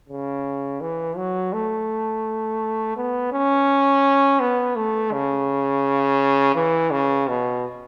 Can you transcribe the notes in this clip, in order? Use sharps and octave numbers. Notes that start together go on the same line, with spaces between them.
C#3
E3
F#3
A3
B3
C#4
B3
A3
C#3
E3
C#3
B2